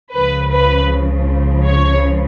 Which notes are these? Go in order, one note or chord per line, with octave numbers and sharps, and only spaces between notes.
C#2 C#3 F3 B4
B4
C#5